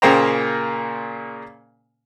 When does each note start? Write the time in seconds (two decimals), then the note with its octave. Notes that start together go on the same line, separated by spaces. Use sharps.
0.02 A#2 C#3 A#3 C5 G5 A#5